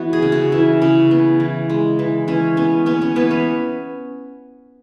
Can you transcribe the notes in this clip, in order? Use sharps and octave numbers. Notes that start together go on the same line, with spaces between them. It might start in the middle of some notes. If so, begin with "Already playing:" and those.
Already playing: E3 B3 F#4
G#4
C#3
F#4
E3 E4
C#3 C#4
B3
E3
G#3
E3
E3 C#4
B3 C#4
B3 C#4
C#4
E3 B3
C#4